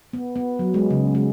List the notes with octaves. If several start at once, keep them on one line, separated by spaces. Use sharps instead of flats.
B3
B3
F#3
G#3
C#3
G#3